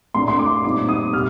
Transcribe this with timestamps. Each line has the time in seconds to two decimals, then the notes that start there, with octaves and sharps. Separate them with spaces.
0.14 A2 A3 D4 C6
0.28 C6
0.39 D6
0.64 A#2 G3 C4 D#4 D6
0.89 D#6
1.13 C3 F6